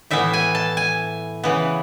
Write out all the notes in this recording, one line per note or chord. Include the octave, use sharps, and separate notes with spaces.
A2 E3 B3 E5
G#5
A5
G#5
C#3 E3 B3